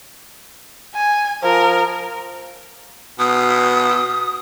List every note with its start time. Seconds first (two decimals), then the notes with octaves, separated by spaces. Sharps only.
0.95 G#5
1.43 F3 A#4
3.19 B2 D#6